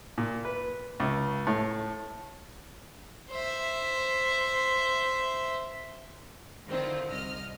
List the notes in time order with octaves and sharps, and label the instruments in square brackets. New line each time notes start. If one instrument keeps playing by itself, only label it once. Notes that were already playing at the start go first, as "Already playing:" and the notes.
[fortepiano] A#2
B4
C#2
A2
[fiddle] C5 E5
[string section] D3 D#3 C4 E4 F4
C2 D#5 F6